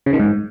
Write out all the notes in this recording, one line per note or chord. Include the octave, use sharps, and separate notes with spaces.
C#3
D#3
G#2